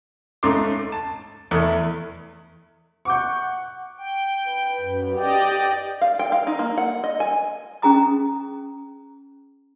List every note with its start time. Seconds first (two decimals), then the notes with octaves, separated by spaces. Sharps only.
0.43 G#2 C#3 A3 D#4 C6 D6
0.92 A5
1.51 E2 A3 E4
3.05 F#5 C#6 D6 G6
3.98 G5
4.47 B4
4.80 F#2
5.16 G4 D5 D#5 G5
6.01 F5
6.19 G5
6.32 F5
6.47 D#4
6.59 A#3
6.78 F#5
7.04 D#5
7.20 G#5
7.82 C#4 G#4 A#5 D#6